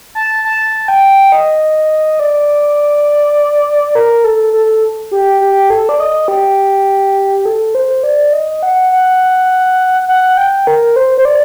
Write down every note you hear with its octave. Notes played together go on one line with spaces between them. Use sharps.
A5
A5
G5
D#5
D5
A#4
A4
A4
G4
G4
A4
D5
D#5
G4
A4
C5
D5
D#5
F#5
F#5
F#5
G5
A#4
C5
C5
D5